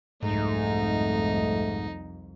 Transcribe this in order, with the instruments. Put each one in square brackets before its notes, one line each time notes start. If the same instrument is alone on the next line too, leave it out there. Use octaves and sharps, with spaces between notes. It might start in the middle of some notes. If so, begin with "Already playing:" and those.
[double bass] C2 F2 [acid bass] G#2 [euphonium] A3 [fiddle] D#4